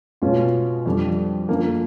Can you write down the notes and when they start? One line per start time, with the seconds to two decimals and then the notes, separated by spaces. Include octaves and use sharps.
0.22 B2 G#3 C#4 F4
0.86 F2 D3 G3
1.48 F#2 D3 F3 A#3